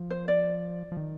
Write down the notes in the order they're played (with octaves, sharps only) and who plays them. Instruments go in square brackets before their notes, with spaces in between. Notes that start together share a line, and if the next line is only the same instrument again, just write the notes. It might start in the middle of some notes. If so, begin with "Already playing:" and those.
Already playing: [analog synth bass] F3
[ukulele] C5
D5
[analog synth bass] F3
D#3